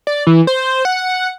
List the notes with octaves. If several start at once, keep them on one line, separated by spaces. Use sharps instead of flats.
D5
E3
C5
F#5